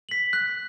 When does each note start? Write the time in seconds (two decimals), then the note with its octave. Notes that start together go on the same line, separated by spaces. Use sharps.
0.09 B6 F#7
0.33 F#6